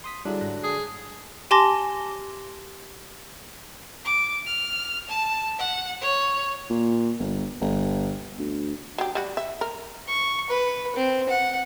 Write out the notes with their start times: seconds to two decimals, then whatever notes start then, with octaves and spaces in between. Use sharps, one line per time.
0.04 C6 D#6 B6
0.25 D3 F#3 G3 D4 E4 G#4
0.41 G#2 F#6 A#6
0.63 G#4 A5 D#6
1.51 G4 G#5 A5 C6 D6 A#6
4.05 D6
4.46 F6
5.09 A5
5.58 F#5
6.01 C#5
6.70 A#2
7.19 G1
7.61 G1
8.39 D2
8.98 F#3 G4
9.15 G3 F#4
9.37 E5
9.61 A#4
10.07 C#6
10.50 B4
10.96 C4
11.29 F#5